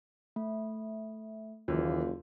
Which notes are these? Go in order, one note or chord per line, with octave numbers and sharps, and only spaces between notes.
A3
F#1 D#2 E3 F4